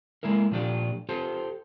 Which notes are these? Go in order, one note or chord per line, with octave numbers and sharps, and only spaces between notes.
G#3 A#3 E4 A#4
A#2 F3 A3 D4 F4 G4
F4 G4 A4 C5